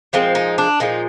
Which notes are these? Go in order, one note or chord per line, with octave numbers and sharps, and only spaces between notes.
A#2 F3 G#3 C4
D#4
D4
A#2 F3 G#3 D#4